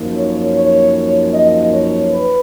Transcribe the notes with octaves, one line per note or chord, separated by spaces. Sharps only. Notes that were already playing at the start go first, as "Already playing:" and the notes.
Already playing: F#2 F3 A#3 D#4
C#5
C#5
D#5
C#5
B4